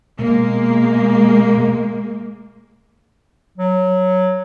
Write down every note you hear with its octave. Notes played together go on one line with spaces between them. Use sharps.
B2 G#3 A#3
F#3